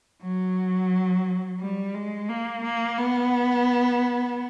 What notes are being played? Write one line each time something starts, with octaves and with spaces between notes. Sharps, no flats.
F#3
G3
G#3
A#3
A#3
B3